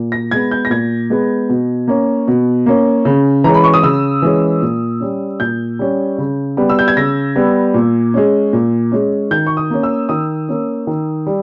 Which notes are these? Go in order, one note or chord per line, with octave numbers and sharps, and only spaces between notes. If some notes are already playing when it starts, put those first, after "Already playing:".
Already playing: A#2
A#6
G#3 B3 G#6
G6
A#6
A#2 G#6
G#3 B3
B2
A#3 C#4
B2
A#3 C#4
C#3
E3 G#3 C#4 A#5
B5
C#6
D#6
C#3 E6
E3 G#3 C#4
A#2
G3 C#4
A#2 G6
G3 C#4
C#3
G3 B3
E6
G6
G#6
C#3 A#6
G3 B3
A#2
G#3 C#4
A#2
G#3 C#4
D#3 G6
C#6
D#6
A#3 C#4
E6
D#3 D#6
A#3 C#4
D#3
G3